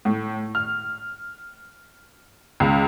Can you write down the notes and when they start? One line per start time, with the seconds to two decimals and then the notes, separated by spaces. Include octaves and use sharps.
0.05 A2
0.55 F6
2.60 C#2